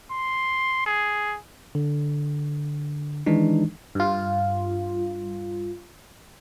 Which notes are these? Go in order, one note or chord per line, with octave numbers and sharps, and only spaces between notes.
C6
G#4
D3
D#3 E3 G#3 D4 D#4
G2 F4